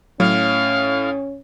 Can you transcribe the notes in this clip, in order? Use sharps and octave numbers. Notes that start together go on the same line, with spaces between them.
A2 F#3 C#4 F5